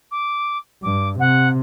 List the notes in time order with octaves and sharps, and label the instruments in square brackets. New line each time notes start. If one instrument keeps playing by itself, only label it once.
[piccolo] D6
[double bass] G2 [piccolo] D6
[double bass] C3 [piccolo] F#5